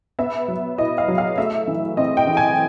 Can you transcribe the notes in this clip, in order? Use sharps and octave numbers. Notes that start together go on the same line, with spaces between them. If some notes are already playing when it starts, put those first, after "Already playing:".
B3 E5
F#3
E4 D#5
F5
F#3
F5
A3 E5
E3
C4 D#5
G5
E3
G#5